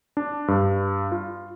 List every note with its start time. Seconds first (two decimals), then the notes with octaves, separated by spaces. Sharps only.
0.17 D4
0.48 G2
1.12 F4